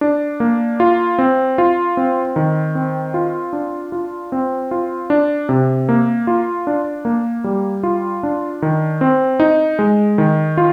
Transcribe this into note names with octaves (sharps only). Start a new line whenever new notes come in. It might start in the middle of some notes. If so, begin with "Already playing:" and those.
D4
A#3
F4
C4
F4
C4
D#3
C4
F4
D4
F4
C4
F4
D4
C3
A#3
F4
D4
A#3
G3
F4
D4
D#3
C4
D#4
G#3
D#3
F4